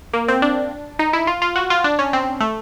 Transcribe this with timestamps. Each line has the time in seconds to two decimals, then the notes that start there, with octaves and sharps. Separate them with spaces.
0.13 A#3
0.28 C4
0.42 D4
0.99 D#4
1.13 E4
1.27 F4
1.42 F4
1.56 F#4
1.70 F4
1.84 D4
1.99 C#4
2.13 C4
2.40 A3